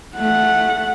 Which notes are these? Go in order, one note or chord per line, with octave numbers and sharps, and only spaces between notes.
A3 F#5